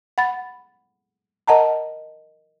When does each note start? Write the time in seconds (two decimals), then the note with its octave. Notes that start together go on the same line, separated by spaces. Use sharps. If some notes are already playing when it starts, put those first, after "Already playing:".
0.18 F#5 B5 A6
1.47 A#4 D#5 F#5 A5 A#5